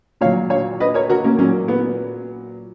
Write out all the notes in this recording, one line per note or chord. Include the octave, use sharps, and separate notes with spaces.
A#2 F#3 C#5 F5
C#5 F5
B4 D#5
A#4 C#5
F#4 A#4
A#3 C#4
A#2 F#3 A#3 C#4
B3